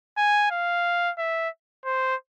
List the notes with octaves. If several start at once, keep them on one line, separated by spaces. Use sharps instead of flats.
G#5
F5
E5
C5